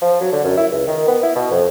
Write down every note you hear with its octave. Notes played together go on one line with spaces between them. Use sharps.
F3
F#3
D3
F#2
E4
C#2
D#3
B3
E4
B2
F2